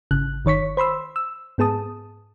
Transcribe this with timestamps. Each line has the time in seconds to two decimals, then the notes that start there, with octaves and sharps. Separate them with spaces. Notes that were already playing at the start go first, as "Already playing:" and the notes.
0.11 G#1 C#3 F#6
0.45 G1 D#3 C#5 C#6 B6
0.77 C5 B5 C6 E6
1.16 E6
1.58 G#2 B3 G#4 A5 D#6